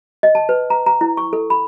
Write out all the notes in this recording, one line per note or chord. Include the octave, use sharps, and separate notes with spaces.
D#5
A5
B4
A#5
A#5
E4
C#6
A4
B5